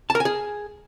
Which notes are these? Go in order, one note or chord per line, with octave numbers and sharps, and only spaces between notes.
A5
A#4
G#5
G#4